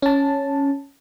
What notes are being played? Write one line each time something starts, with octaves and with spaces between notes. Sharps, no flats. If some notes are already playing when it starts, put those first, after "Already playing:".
C#4 A5